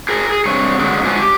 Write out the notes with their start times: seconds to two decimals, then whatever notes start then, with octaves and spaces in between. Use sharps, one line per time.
0.09 G#4 A#4
0.29 G#4
0.46 G2 C3 C#5
0.79 D3 F#3 G#3 A#3 C#4
1.03 G#2 F3 F#3 C#4 D4 G#5
1.19 G4